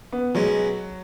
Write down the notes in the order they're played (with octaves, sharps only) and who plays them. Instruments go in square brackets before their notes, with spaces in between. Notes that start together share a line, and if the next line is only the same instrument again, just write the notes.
[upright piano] B3
[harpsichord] B2 G#3 C#4 [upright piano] F#3